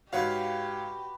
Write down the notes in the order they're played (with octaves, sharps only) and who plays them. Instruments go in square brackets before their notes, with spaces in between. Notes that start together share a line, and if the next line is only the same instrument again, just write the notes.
[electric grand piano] G#2 C#5 F5 [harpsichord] F#4 B4 [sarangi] G4